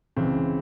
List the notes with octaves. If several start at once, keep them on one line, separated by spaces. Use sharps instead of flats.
C#2 C#3 E3 C4